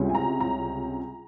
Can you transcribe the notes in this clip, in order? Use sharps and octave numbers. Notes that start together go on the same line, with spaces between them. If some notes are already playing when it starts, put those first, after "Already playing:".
Already playing: C#2 C3 G3 C#4
G#5
A#5
A#5